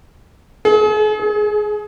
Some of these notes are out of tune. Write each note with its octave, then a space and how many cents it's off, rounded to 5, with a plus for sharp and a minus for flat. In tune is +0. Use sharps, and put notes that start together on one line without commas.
G#4 +40
G#4 +15